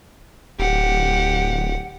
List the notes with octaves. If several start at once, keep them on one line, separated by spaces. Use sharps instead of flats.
D1 G4 F#5